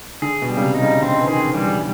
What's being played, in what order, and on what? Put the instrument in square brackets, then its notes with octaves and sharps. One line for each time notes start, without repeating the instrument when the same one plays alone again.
[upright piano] D3 [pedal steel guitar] G#4
[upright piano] B2
[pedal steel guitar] G3
[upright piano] C#3
C3
[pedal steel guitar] D#4
[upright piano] C#3
[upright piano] D3 [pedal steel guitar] C4
[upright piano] E3
[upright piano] D#3 [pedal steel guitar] G#4
[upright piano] E3 [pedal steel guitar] G3